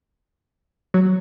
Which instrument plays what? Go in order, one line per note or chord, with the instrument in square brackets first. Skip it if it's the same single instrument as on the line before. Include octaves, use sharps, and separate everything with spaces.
[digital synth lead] F#3